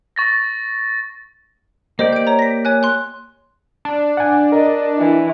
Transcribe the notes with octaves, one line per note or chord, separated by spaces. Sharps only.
C#6 A6 A#6
A#3 G4 C5 D5 D#5
G6 D7
C#5 A#5
A#6 B6
C#5 G#5 F#6
C6 F#6
D4
F#5 G#5
A#4 D#5
E3